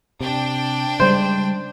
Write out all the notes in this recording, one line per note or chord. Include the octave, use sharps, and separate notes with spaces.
C3 D4 G5
C#3 G3 G#3 C5